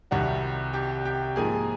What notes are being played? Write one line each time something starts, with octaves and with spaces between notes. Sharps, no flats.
C2 C3 D#3 G3 F#4 F#5
G4 G5
G4 G5
G#2 F3 A#3 G#4 G#5